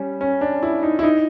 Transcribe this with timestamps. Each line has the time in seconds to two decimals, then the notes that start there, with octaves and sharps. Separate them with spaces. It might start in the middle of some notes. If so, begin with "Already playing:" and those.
Already playing: G3 C#4
0.21 C#4
0.41 D4
0.63 E4
0.83 D#4
0.99 E4
1.03 D#4